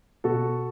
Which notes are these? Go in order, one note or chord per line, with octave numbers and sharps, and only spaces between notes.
B2 F#4 A4